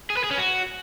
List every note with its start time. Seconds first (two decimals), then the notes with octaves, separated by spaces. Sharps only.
0.10 G#4
0.17 B4
0.24 G#4
0.31 C#4
0.38 F#4